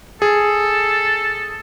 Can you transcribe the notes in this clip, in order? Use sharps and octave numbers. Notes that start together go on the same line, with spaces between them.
G#4 A4